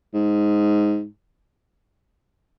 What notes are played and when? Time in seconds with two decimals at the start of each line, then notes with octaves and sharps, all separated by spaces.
0.14 G#2